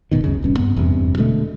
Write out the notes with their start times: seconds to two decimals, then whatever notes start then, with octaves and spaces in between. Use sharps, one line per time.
0.11 D1 G#2 B2 D#3
0.24 C#2 F#2 C#3
0.43 D#1 G2 C#4
0.57 G2 B3
0.76 F1 E2 G2 C3
1.18 B2 D3 G#3 A3